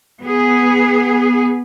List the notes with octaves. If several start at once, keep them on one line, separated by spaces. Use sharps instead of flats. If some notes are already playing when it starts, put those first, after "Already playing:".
B3 G#4